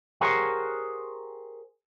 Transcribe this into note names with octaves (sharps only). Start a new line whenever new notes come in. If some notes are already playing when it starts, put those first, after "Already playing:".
G4 G#4 A#4 C5 C#5 F#5